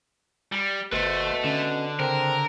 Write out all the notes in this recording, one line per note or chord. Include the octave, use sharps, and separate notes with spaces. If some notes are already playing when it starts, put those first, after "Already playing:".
G3
G1 B2 A3 B4 C5
D3 C#4
C#3 C4 A#4